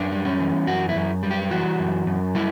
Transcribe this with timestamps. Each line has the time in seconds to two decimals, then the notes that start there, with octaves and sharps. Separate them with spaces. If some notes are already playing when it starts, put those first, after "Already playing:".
Already playing: F#2 D4
0.12 G3
0.25 C#4
0.39 E3
0.67 F#2 F#4
0.89 E4
0.95 F#2
1.23 G3
1.31 G4
1.51 E3 F#4
1.79 F#2
2.07 F#2
2.35 G3 E4